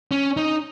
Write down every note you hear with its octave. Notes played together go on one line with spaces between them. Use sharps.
C#4
D#4